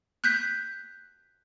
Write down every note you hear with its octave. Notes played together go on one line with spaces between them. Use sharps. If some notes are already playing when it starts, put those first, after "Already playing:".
F#6 G6 B6